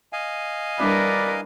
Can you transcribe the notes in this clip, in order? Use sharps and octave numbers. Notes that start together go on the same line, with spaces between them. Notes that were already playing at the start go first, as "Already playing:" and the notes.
D#5 F5 G#5
G3 D4 E4 A#4 B4 D5